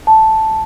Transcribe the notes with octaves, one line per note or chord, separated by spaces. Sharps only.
A5